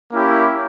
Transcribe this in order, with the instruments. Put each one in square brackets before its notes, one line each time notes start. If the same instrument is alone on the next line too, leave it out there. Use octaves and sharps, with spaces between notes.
[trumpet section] A#3 C#4 E4 G4